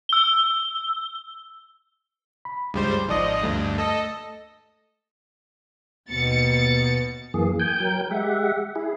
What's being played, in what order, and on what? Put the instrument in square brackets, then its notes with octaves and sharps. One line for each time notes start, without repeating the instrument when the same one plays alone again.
[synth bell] E6 G7
[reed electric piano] B5
[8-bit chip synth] C#2 G3 C5 [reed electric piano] G2 G#3
[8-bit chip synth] G#1 F3 D#5 [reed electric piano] G#2 D5 D#6
[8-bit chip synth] D2 G2 [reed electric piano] A3
[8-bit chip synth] A4 D#5
[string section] D#2 B2 A6 C#7
[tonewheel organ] F#2 E3 A#3 G#4
G5 G#5 G6
F#3 A#4 G5 G6
G#3 G4 E5 F#5
E4 G#4